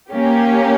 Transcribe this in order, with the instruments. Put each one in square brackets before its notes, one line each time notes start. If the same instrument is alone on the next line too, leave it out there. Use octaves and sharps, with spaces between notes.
[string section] A#3 C#4 G4